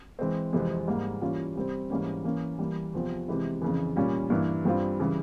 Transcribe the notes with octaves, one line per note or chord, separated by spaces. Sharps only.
E3 G#3 C4
F2 C3 E3 G#3 C4
G#2 G3 A#3
E3 G3 A#3 C#4 F4
C3 G3 C4
G#2 E3 G3 A#3 C#4
E3 A#3 C#4
E3 G3 A#3
E2 C3 F3 C4
C3 E3 G#3 E4
F2 C#3 E3
A#2 G3 C#4 F4
G2 E3 A#3 E4
G2 G3 C4 F4
C#3 E3 G3